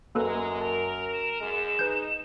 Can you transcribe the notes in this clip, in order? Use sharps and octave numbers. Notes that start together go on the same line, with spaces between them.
F#2 G#3 A#3 A4 B4 A#5
A#4 A5 F7
E7
F#2 G#3 E7
D#4 B4 G6